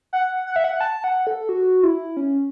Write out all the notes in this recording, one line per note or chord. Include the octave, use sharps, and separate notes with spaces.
F#5
F#5
E5
F#5
F#5
A5
F#5
A4
F#4
E4
C#4